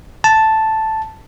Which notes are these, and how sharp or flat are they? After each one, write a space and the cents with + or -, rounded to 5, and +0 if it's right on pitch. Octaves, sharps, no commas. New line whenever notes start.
A5 +0